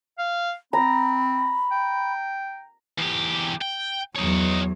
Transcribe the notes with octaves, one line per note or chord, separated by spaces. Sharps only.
F5
C4 A#5 B5
G5
E2 G4
G5
E2 F#3 D#4 C#5